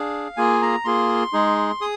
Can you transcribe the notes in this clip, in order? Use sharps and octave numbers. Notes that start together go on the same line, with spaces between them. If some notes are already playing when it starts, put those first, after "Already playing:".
Already playing: D4 G#4 F5
A#3 F4 G#4 G#5
A#5
A#3 F4 G#4 C6
G#3 D#4 G#4
G#4 D#6